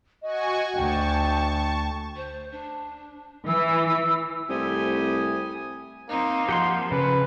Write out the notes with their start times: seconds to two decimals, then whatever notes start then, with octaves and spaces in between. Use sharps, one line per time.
0.23 F#4 D#5 G#5 C#6
0.76 D2 G5 A5 C#6
2.16 C5
2.51 D4
3.47 E3 E6
4.50 C2 A3 C4 G4 G#5 D#6
6.09 A#3 C4 D#4
6.49 F3 G4 F#5 C6
6.91 C#3 B4